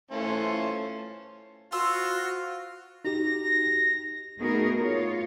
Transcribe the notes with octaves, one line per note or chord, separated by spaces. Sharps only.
E3 A3 C#4 F4 A4 C5
F4 F#4 C5 E6
D#4 F#4 G4 A#6
A3 B3 D#4 F#4 G#4 A#4
F4 C#5